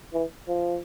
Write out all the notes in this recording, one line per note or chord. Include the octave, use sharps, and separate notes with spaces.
E3
F3